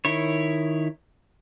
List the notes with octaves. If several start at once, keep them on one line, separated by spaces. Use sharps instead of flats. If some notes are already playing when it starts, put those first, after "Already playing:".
D#3 E4 C#5